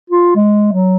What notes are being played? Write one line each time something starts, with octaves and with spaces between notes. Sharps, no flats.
F4
G#3
F#3